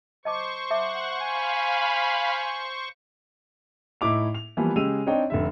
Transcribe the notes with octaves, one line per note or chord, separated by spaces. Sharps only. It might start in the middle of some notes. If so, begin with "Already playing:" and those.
C5 D#5 A5 C#6 D6
E5 F#5 A5 D6
F5 G#5 B5
A2 D#4 E4 D6 F7
F7
E3 F3 G3 A#3 B3
C#3 G#3 G4 E6 D#7 F7
C4 D4 D#4 C#5 D#5 G5
F1 D3 E5